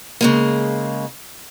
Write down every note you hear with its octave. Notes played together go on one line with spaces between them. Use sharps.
C#3 G#3 A#3